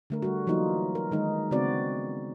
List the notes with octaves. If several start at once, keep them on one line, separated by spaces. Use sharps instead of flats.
D3 A3 A#4
G3 F#4
E3 F#3 A#3 D#4 F4
A#4
D#3 G#3 D#4
C#3 G#3 B3 C4 F#4 D5